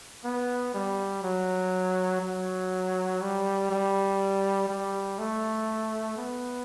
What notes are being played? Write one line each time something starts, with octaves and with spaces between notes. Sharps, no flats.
B3
G3
F#3
F#3
G3
G3
G3
A3
B3